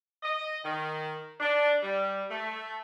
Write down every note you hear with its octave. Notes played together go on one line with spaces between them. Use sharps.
D#5
D#3
D4
G3
A3